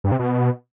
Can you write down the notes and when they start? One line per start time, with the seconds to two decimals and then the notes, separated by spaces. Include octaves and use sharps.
0.04 G2
0.12 C3
0.19 B2